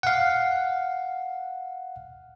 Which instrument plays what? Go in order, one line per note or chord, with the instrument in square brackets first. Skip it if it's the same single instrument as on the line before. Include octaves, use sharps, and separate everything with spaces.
[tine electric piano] F5 F#5